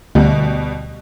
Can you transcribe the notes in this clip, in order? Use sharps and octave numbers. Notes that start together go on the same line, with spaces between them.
D2 B2 G3